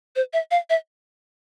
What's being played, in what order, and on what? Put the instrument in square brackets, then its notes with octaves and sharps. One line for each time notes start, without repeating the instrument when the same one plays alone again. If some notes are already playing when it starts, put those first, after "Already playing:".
[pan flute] C5
E5
F5
E5